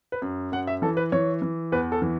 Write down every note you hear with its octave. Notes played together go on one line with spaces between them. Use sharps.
B4
F#2
F#2 F#5
E5
E3 A4
B4
E3 C#5
E3
E2 B4
A4
E3